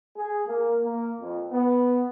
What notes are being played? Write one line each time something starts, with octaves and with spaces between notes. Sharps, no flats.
G#4
A#3
A#3
F2
B3